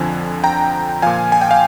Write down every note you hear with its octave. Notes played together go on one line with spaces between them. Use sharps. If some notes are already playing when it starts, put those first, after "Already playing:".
Already playing: F2 D3 F3 G#5
G5 A#5
A#2 F3 F5 G#5
G#5
G5
F5